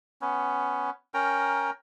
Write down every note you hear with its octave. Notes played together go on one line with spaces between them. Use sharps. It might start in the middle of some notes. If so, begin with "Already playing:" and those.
B3 C#4
C#4 A#4 G5 A#5